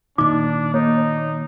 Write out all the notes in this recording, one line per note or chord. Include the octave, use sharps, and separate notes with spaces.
A#2 D#3 D4 D#4 D6
A#3 D#4 C#5